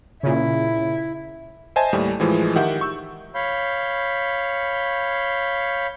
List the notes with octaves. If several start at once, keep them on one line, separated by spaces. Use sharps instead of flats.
A#2 C#3 E4
C5 D#5 E5 G#5 A5
D#2 A2 G3
A2 E3 F3 G#3
D#3 G4 E5 F#5 G6
C#6 E6
C#5 F5 B5 G6